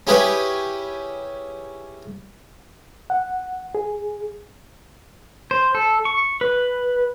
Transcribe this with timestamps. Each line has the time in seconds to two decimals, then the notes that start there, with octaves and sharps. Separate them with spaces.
0.07 C#4 E4 G4 G#4 B4 C#5
3.10 F#5
3.75 G#4
5.51 C5
5.75 A4
6.05 C#6
6.41 B4